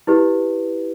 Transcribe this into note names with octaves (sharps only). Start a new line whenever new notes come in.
E4 G4 B4